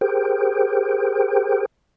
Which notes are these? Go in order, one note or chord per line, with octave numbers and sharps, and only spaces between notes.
G4 G#4 A#4 C5 G5